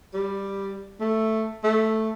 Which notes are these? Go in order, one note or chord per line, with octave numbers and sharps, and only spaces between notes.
G3
A3
A3